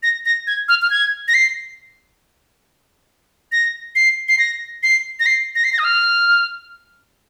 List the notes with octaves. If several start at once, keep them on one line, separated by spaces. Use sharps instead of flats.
A#6
A#6
G#6
F6
F6
G#6
A#6
C7
A#6
C7
C7
A#6
C7
A#6
C7
A#6
C7
A#6
D#6
F6